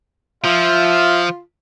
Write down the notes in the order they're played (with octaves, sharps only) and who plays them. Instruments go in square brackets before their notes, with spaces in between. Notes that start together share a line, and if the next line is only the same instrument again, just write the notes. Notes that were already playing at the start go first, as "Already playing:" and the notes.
[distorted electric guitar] F3 [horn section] F4 [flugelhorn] E5